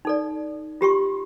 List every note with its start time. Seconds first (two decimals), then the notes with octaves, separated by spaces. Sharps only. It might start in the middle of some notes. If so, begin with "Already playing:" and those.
0.05 D#4 A4 D5
0.81 F4 G4 C6 C#6